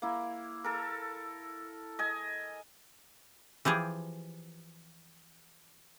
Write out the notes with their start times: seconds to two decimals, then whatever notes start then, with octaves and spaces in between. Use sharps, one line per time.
0.02 A#3 E4
0.64 A4 A#4
1.99 D#5 G#5
3.65 E3 F3 G4 G#4